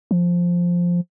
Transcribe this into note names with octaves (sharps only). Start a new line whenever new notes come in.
F3